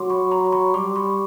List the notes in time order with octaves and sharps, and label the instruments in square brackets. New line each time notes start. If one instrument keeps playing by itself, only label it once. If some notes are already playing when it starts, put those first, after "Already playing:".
Already playing: [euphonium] F#3 [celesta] C6 D6
[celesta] B5 C#6
A#5 C6
B5 C#6
[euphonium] G3 [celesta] C6 D6
[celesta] B5 C#6